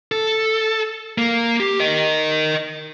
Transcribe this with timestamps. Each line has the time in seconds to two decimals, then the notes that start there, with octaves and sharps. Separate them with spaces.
0.12 A4
1.18 A#3
1.60 G4
1.80 A#4 D#5